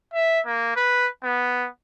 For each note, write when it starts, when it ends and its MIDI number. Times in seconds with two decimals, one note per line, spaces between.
0.13 0.40 76
0.46 0.74 58
0.76 1.08 71
1.24 1.68 59